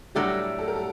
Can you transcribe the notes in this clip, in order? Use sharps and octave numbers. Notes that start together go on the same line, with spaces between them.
A2 F#3 G3 A3 D4 F#4 G4
A4
A#4
A4